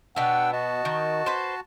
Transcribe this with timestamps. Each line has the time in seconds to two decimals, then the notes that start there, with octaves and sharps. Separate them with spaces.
0.16 B2 B3 D4 F#5 G5 E6
0.53 F#4 D#5 A5
0.85 D#3
1.26 B4 C5